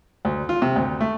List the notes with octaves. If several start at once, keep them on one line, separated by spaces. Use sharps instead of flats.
D2
F4
C3
D2
A3